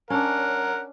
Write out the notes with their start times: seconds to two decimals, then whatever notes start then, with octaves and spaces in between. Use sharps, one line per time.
0.10 C#4 D4 A#4 F#5